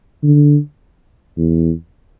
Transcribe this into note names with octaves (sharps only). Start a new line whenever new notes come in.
D3
E2